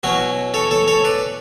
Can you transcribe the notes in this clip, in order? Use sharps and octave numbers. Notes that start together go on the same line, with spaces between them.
B2 F#3 C#4 E4 F#4
A4 C#5
A4 C#5
A4 C#5
B4 D5